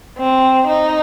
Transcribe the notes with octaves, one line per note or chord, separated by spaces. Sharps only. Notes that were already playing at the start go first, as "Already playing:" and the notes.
C4
D#4